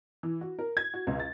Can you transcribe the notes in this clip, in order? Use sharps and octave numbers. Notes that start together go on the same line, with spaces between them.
E3
F#4
A#4
G#6
F#4
C#2
A6